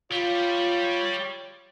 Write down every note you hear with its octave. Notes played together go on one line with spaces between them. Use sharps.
G3 F4 C#5